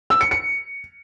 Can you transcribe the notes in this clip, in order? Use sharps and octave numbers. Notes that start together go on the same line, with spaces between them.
E6
C#7
C#7